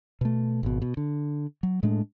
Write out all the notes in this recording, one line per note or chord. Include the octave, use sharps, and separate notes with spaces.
B2 A3
G#1 B2
B2
D3
F#3
A2 G#3 A3 D4